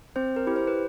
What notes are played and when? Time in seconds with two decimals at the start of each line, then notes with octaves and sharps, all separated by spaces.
0.16 C4 C5
0.36 A#4
0.47 E4 G4
0.56 C5
0.67 B4